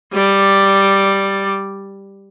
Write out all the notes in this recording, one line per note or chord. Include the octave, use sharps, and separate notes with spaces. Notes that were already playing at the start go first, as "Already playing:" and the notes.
G3 D5